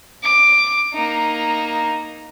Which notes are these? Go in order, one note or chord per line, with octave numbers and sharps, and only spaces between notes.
D6
A#3 D#4